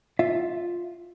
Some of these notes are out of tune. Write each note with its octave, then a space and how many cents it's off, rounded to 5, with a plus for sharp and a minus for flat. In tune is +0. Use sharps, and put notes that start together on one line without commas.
F4 +0 E5 +10